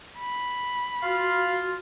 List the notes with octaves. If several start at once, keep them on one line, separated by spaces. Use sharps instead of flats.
B5
F4 F#4 F5